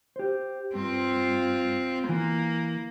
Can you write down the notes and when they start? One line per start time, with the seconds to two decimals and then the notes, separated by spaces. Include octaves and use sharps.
0.16 G4 C5
0.75 G2 C4 F4
2.09 E3 A#3